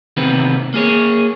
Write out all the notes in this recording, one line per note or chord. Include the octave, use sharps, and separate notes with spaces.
C3 D#3 E3 B3 C4 B4
A#3 G#4 C#5